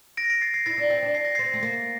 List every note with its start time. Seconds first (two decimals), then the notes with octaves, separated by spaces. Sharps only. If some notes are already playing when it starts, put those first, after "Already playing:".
0.17 A#6 D7
0.30 A#6 D7
0.41 A6 C7
0.54 A6 C7
0.66 E4 A6 C7
0.78 D4
0.90 C4
1.03 D4
1.15 C7
1.25 A#6
1.35 C4 A6 C7
1.54 A3
1.63 A#3